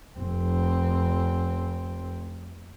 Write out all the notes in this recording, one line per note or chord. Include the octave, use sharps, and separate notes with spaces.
F1 C4